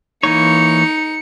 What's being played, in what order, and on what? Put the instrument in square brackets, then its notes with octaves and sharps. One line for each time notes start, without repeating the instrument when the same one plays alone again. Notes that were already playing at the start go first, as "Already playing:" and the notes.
[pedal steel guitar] E3 A#3 C#5 [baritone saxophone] D#4 [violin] C#7